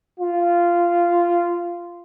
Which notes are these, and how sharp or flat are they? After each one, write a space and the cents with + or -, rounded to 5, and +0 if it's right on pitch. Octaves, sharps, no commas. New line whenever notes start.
F4 -10